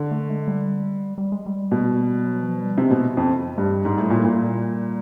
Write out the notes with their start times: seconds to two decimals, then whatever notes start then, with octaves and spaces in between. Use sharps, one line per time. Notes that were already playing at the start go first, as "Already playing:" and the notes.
Already playing: D3
0.11 A3
0.29 G#3
0.48 G3
1.18 G3
1.32 G#3
1.46 G3
1.72 B2
2.25 F#3
2.43 F3
2.60 G3
2.78 C3 G#3
2.91 B2
3.17 F2
3.58 G2
3.85 G#2 G3
3.98 A2
4.10 A#2
4.25 A#2